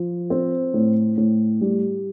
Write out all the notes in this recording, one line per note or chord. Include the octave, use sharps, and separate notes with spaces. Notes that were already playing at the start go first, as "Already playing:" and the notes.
Already playing: F3
C4
A2
A2
G3